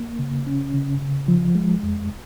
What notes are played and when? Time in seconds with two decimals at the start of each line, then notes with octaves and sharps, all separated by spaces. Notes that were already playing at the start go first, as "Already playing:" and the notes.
Already playing: A#3
0.19 C#3
0.47 C#4
0.73 C#3
1.01 C#3
1.28 F3
1.55 G#3
1.83 F2